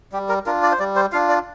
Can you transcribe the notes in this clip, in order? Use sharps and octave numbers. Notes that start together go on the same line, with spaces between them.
G3 G4
A#4
D4 F4 A#4
D5
C5
G3 D5
C5
D4 F4 F5
D5